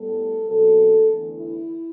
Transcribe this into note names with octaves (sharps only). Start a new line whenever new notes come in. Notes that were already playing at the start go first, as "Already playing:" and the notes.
Already playing: A2 G3 B3 A4
B2 F#3 C4 A4
E2 D3 A3
E4